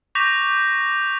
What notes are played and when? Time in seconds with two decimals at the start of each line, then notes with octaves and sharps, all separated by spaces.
0.15 C#6 D6 G6 A#6 B6 F7